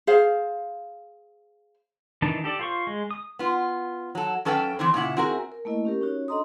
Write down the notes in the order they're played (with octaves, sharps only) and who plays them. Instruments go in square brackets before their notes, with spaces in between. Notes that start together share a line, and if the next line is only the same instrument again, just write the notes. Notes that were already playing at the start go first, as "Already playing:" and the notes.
[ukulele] G#4 C5 F5
[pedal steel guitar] D#3 E3 D4 D#4 A5
G4 A4 D5
F4 C5 C#6
G#3
D#6
[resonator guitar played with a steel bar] B3 F4
F#3 A4
F#2 C#4 A4 B4 F5 G5
E3 C4 E4 C5
A#2 C#3 E4 F#5
C4 E4 F#4 G#4 A#4
[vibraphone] A#4
A3 A#3 E4 D#5
C#4 G4 A#4
C#4 D#4 F#4 C#5
D4 A4 D#5 A#5 C6 D#6